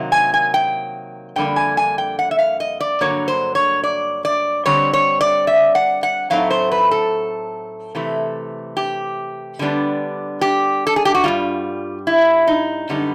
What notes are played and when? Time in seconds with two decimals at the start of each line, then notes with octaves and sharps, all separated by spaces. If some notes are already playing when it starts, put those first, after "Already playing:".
Already playing: C3 D#3 F#3 A#3
0.12 G#5
0.34 G#5
0.54 G5
1.36 F2 D3 G3 A#3 D4 G5
1.56 G#5
1.77 G#5
1.98 G5
2.19 F#5
2.31 E5
2.39 F5
2.60 D#5
2.80 D5
3.01 G2 D3 F#3 A#3 C#5
3.28 C5
3.55 C#5
3.83 D5
4.25 D5
4.66 D3 G3 C4 C#5
4.93 C#5
5.21 D5
5.47 E5
5.75 F#5
6.03 F#5
6.30 A2 F#3 A3 C4 D#4 F5
6.51 C5
6.72 B4
6.91 A4
7.95 C3 E3 A3
8.77 G4
9.59 D3 G3 B3 D4
10.41 G4
10.87 A4
10.96 G#4
11.05 G4
11.15 F#4
11.24 G2 D#3 G3 F4
12.07 E4
12.47 D#4
12.89 F#2 D3 G3 B3 D#4